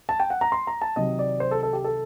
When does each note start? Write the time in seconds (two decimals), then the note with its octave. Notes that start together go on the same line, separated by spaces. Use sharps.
0.09 A5
0.20 G5
0.30 F#5
0.41 A#5
0.52 C6
0.67 A#5
0.81 A5
0.96 C3 D#3 F#3 D#5
1.19 D5
1.40 C5
1.51 A4
1.63 A4
1.73 G4
1.84 A4